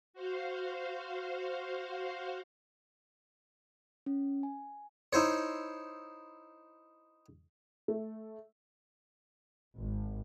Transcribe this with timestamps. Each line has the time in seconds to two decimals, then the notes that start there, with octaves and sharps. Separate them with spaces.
0.14 F#4 C5 F5
4.06 C#4
4.43 G#5
5.13 D#4 E4 C5 C#5
7.88 A3
9.79 G#1